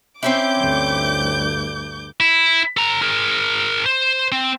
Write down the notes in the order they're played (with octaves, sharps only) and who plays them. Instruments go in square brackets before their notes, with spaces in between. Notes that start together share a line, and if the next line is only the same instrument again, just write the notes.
[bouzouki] C4 C#4 E4 [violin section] D6 G6
[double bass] D2 G2
[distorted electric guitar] E4
A4 A#5
G#4 A#4
C5
C4